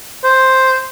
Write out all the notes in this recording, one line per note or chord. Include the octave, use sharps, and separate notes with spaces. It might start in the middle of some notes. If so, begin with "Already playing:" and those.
C5